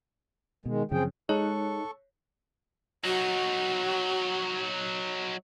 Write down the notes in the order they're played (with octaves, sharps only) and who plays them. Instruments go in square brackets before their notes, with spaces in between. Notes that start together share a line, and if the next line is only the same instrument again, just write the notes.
[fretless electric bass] B2 [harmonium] D#3 G#3
[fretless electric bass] F#2 C#3 F3 [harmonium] C4 G#4 G5
[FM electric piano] G#3 [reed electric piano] D#4 [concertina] A4 C#6 [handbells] C#5
[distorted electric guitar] F#3 D#4 [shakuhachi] F#4